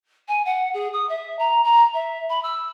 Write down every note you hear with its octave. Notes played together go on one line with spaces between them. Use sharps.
G#5
F#5
G#4
D#6
E5
A#5
A#5
E5
B5
E6